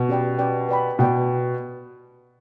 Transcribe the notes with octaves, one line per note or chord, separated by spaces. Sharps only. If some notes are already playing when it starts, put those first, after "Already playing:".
Already playing: B2
C#4 G4 B4 D5 G5
C#4 G4 B4 D5 G5
B4 D5 G5 B5
B2 B4 D5 G5 B5